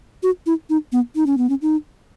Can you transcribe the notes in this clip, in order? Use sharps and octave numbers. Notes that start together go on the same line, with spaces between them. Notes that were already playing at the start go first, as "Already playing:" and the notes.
F#4
E4
D#4
B3
D#4
C#4
B3
C#4
D#4